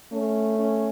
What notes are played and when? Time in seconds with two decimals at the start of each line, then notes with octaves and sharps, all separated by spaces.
0.12 A3 C#4
0.59 C#4